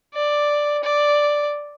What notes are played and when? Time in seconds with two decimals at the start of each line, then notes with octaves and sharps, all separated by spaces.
0.14 D5
0.84 D5